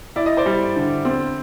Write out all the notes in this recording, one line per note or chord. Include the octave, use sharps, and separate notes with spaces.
E4 D5
D#5
C5 D5
G3
D3
C4